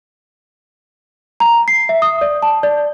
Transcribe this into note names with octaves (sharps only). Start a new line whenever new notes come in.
A#5
C7
E5
D#6
D5
A5
D5